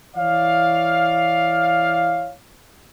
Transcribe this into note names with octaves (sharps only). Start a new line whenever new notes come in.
E3 E4 C#5 D5 F5